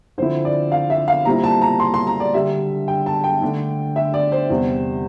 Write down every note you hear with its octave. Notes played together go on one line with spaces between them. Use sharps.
D3 F3 C4 E4 C5
D5
F5
E5
F5
A#2 G3 C4 E4 A#5
A5
A#5
C6
C6
A#5
D5
D3 G3 D4 E5
G5
A5
G5
D3 A3 D4
E5
D5
C5
E2 C3 G3